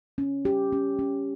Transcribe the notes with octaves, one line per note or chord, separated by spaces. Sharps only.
C#4
G4
C#4
C#4